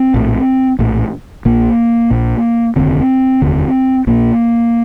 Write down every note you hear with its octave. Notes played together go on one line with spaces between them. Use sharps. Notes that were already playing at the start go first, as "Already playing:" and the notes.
Already playing: C4
A#1 A2
A#1 A2
A#1 A#2 A#3
A#1 A#2
F1 D#2 D3 C4
F1 D#2 D3
A#1 A#2 A#3